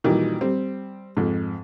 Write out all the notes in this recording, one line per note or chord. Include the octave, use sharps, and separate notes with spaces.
A#2 D#3 E3 F#3 G3
G3 C4
F2 G#2